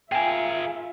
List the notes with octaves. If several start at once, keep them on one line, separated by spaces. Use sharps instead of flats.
F4 G#4 A#4 E5 G5 G#5